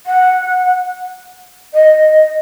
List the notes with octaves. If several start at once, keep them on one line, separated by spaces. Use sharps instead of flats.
F#5
D#5